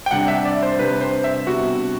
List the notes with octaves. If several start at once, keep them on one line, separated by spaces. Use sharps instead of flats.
G5
C3 G3 D4 F#5
E5
D5
C5
C3 G3 D4 B4
C5
E5
C3 G3 B3 D4 F#4